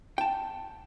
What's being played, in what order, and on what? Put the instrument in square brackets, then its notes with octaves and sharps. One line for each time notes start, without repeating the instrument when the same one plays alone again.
[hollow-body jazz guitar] G5 A5